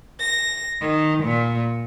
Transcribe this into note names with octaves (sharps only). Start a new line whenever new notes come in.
A#6
D#3
A#2